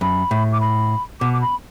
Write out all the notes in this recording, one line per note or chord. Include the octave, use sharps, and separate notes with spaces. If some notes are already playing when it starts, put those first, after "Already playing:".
F#2 B5
A2
D6
B5
B2 D6
D6
B5